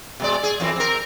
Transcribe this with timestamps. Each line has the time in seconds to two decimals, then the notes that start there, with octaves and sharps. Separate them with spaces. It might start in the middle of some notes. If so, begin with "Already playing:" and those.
0.20 B2 G#3 D5
0.43 G#4
0.60 F2 E3 C4
0.76 C4 A#4